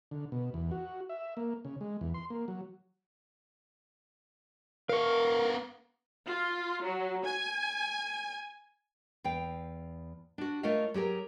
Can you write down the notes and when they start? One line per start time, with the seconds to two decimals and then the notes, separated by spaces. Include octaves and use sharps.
0.11 D3
0.32 B2
0.54 E2
0.71 F#4
1.09 E5
1.37 A#3
1.65 C#3
1.81 G#3
2.01 E2
2.14 C6
2.30 A#3
2.48 F#3
4.89 B3 A#4 F5 C#6
6.25 F4
6.83 F#3
7.24 G#5
9.24 E2 F5 G5
10.38 D4 F#4
10.63 A3 F4 A#4 C#5 D#5 F5
10.94 F#3 G4 G#4 A#4